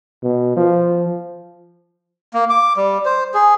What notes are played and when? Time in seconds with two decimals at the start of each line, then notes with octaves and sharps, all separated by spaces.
0.23 B2
0.57 F3
2.33 A#3
2.50 D6
2.77 G3
3.05 C5
3.34 G#4